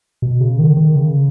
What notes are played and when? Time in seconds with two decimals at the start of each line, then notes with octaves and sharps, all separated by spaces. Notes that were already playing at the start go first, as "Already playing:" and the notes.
0.22 B2
0.40 C#3
0.59 D#3
0.77 D#3
0.96 C#3